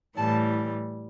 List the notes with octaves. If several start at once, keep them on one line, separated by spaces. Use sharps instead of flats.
A2 E3 G3 A5